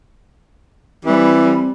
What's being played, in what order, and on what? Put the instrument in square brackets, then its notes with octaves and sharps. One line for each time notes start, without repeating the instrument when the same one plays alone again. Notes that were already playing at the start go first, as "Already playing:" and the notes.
[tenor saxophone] E3 [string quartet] G3 [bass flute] C4